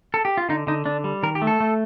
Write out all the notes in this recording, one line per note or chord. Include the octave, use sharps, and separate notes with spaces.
A4
G4
F4
D3 D#4
D3 D#4
D3 D4
G3
D#3 A#4
G4
A3
A4
A3